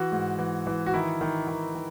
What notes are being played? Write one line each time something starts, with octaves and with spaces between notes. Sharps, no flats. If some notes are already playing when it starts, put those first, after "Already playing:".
Already playing: E3 F#4
G#2
E3
E3
F#4
D#3 E4
D#3
D#3
D#3